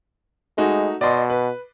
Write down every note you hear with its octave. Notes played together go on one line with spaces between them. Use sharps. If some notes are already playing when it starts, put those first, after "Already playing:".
G#3 A3 D#4 F#4
B2 D5 D#5 C6
B4